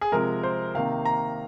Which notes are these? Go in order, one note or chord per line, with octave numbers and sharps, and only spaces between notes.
G#4
C3 F3 G#3 A#4
C5
C3 D#3 A#3 F5
A#5